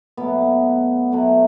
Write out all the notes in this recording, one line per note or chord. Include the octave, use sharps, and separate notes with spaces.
B2 F#3 A3 B3
B2 F#3 A3